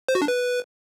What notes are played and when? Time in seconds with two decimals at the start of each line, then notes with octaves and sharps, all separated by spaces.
0.08 C5
0.15 F#4
0.22 D4
0.28 B4